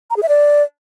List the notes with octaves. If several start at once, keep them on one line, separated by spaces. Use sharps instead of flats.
A#5
G#4
E5
D5